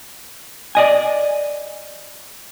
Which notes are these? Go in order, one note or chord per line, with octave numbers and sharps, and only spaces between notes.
D5 D#5 G#5